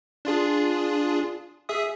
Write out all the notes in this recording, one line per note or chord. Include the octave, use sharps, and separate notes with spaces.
D4 F4 G#4
G#4 E5 D#6